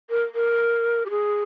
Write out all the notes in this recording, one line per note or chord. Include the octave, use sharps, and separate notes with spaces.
A#4
A#4
G4
G#4